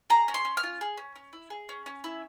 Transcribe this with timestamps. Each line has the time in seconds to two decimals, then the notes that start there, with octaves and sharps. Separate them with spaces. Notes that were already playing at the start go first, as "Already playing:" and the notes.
0.10 G#4 A#5
0.28 C#4
0.34 C6
0.45 C#4
0.57 F6
0.63 F4
0.81 G#4
0.97 C#4
1.16 C#4
1.33 E4
1.50 G#4
1.69 C#4
1.86 C#4
2.04 E4